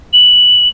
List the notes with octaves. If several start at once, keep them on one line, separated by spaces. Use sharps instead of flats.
F#7